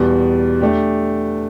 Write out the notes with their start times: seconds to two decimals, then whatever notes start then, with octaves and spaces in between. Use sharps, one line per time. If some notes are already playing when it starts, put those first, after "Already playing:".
Already playing: E2 B2 G3
0.61 A3 D4 G4